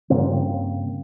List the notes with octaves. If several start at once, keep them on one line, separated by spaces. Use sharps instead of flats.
G2 C#3 A#3 C4